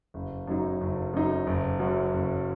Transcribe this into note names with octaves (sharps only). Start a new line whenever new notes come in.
F#1
F#2 F#3 D#4
F#1
F#2 F#3 D#4
F#1
F#2 F#3 C#4 F#4
F#1